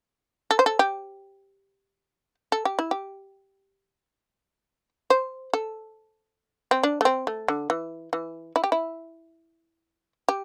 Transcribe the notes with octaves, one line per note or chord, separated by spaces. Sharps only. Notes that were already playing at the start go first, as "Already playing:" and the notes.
A4
C5
A4
G4
A4
G4
E4
G4
C5
A4
C4
D4
A3
C4
A3
D3
E3
E3
E4
G4
E4
G4